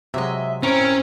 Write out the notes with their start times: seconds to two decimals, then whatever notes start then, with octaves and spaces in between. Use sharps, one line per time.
0.14 C3 F#3 G#3 D#5 E5
0.63 C4 C#4 E4 A#4